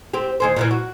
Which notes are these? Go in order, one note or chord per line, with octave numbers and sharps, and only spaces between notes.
C4 G4
D#2 G#4 C5
A#2 D#3 E3
F#4